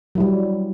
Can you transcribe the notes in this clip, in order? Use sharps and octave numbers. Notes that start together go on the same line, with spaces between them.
F#3 G3 E4